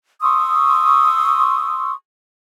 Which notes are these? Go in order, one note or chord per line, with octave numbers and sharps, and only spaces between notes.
C6 C#6 D#6 E6